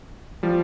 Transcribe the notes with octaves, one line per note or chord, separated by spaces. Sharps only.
F3 G3